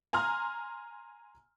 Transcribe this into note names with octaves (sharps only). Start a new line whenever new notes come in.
G#5 A#5 C6 F6